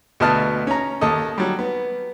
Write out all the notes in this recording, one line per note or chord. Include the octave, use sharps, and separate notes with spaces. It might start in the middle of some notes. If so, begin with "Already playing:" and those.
D2 B2 B3 D#5 A5 F6
C#4 A#5
D#2 A4 D#5
F#3 G3
B3